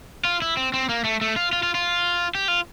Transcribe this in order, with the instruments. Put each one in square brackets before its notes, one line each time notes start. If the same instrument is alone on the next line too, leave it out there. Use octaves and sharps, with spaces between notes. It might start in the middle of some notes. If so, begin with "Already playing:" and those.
[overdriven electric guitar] F4
E4
C4
C4
A#3
A3
A3
F4
F4
F4
F4
G4
F4